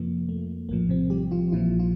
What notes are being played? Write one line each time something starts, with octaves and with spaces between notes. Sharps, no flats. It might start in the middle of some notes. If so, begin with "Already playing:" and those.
Already playing: F2 C3 F3 A#3
A3
A#1 A2 F3 A#3
C3 C4
G3 G4
F3 F4
A#1 A#2 E3 F3 E4
F3 F4